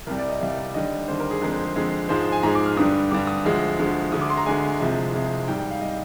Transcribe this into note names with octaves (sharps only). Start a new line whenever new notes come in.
C2 C3 G3 A#4
D5
D#5
C2 C3 G3 F5
D#2 D3 G3 D#5
D#2 D3 G3 C5
A#4
G#4
F2 D3 G#3 A#4
C5
G#4
F2 D3 G#3
G#2 F3 G#3 C5
C5
G#5
G#2 F3 G#3 A#5
D6
F6
G2 D3 G3 D#6
G2 D3 G3 D6
D#6
D2 D3 F3 G#3
D2 D3 F3 G#3
D2 D3 G#3 D#6
D6
C6
A#5
D2 D3 G#3 G#5
C2 C3 F3 G#3
C2 C3 F3 G#3
G#2 G3 G5
G5
F5
G3 D#5